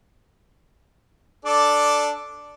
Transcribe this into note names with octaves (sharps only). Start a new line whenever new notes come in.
D4 A4 D5